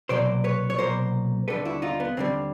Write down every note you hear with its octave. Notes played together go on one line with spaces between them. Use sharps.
C2 B2 F#3 A#3 C5 D5
B4 C#5
C#5
C2 B2 F#3 A#3 A#4 C5
D#2 D3 G3 A4 B4
E4 F#4
D#4 F4
B3
D#2 D3 G3 C4